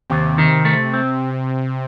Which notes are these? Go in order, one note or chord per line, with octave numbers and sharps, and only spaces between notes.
D#2 C3
D#3
A3
C4